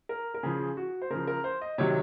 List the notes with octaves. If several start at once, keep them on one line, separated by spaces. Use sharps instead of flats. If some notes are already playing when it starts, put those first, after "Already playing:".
A#4
A#4
C#3 F3 G#4
F#4
C5
C#3 F3 A#4
A#4
C5
D#5
C3 D#3 F#3 C#5